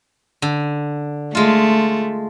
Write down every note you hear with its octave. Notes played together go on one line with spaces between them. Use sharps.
D3
G#3 A3 F4